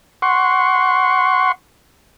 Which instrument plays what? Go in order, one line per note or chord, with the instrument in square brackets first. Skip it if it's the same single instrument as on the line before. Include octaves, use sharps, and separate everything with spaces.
[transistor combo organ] F#5 C6 C#6